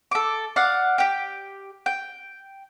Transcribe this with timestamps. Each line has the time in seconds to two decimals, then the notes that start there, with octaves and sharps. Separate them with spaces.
0.11 A4 D6
0.56 D5 F5 F#5
0.98 G4 G5
1.86 G5